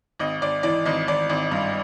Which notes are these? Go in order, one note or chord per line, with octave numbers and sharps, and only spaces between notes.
G#1 D#5
G#1 D5
E3 D5
G#1 D#5
G#1 D5
G#1
G2